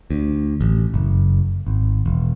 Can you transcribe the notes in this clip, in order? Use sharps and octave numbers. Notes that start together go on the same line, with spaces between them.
D2
A1
F#1
G#1
E1